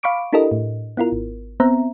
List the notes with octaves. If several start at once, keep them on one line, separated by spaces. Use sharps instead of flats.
F5 B5 C#6 D6 D7
D4 E4 G4 A4 A#4 D#5
A2
B3 E4 F4 A#4
G#1
B3 C4 C5 E5 A#5